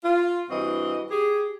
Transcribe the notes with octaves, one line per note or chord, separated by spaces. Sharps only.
F4
G2 E3 C4 F#4 D#5
G4 G#4